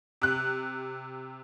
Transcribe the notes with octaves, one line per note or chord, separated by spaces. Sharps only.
C3 F#6